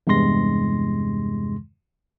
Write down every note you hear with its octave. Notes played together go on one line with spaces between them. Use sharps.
E2 G2 C3 G#3 C6 A#6